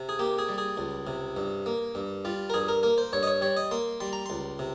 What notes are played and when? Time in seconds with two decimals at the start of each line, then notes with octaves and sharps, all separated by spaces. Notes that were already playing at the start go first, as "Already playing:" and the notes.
Already playing: C3
0.09 G#4
0.19 A#3 G4
0.39 G#4
0.48 G3
0.58 G#4
0.77 C#2
1.07 C3
1.36 G2
1.66 A#3
1.95 G2
2.25 G3 F4
2.50 A#4
2.54 G2 G#4
2.68 A#4
2.83 A#3 A#4
2.98 C5
3.13 G2 C#5
3.23 D#5
3.27 C#5
3.41 G3 C#5
3.57 D#5
3.71 A#3 C6
4.00 G3 C6
4.13 A#5
4.26 C#2 C6
4.59 C3